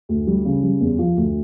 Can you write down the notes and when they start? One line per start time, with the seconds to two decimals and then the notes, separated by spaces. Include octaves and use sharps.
0.09 D2
0.27 G3
0.45 C#3
0.63 G3
0.80 E2
0.99 F3
1.17 D2